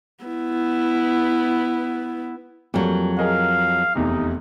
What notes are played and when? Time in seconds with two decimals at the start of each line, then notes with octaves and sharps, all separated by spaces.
0.25 B3 E4
2.74 F2 F#3 G3 A#3
3.19 G#4 A#4 D#5 F5
3.95 F1 E2 C3 D#4